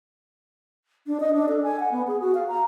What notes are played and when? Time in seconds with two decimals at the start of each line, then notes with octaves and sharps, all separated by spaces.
1.07 D4
1.20 D#5
1.33 D4
1.49 A4
1.63 G#5
1.80 F#5
1.92 B3
2.07 G#4
2.21 F#4
2.35 F5
2.48 A#5